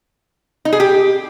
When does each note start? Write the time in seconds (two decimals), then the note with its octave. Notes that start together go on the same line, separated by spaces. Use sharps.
0.65 D#4
0.73 G#4
0.80 G4